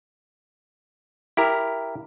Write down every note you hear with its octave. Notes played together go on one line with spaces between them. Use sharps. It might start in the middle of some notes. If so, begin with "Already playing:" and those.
E4 G4 A#4